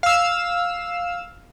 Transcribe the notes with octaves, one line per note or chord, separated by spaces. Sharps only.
F5 E6